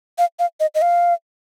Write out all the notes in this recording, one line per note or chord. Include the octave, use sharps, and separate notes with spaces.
F5
F5
D#5
D#5
F5